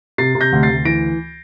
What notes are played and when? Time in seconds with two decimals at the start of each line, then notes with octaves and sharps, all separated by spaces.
0.18 C3 A6 C7
0.35 C3
0.41 G6 A#6
0.52 D2
0.63 A6 C7
0.69 D2
0.85 E3 A#6 D7